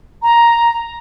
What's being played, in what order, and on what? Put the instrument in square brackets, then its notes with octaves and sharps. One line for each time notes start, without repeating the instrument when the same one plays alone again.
[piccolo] A#5